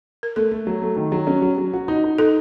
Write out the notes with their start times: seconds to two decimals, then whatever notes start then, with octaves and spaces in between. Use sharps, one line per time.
0.23 A#4
0.36 A3 A4
0.51 A3
0.67 F#3
0.82 A3
0.97 D#3
1.12 F#3
1.27 C#4
1.42 F#3
1.58 F#3
1.73 F#4
1.88 D#4
2.04 D#4
2.18 D#4 A4